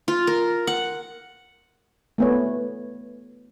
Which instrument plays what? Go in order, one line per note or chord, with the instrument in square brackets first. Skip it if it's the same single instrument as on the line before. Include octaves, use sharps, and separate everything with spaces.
[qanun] F4
A#4
F#5
[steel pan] A3 B3 C#5